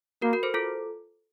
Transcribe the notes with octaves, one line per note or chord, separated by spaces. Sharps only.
A#3 F#4 A#4
F#4 A#4
A4 C5
F4 A4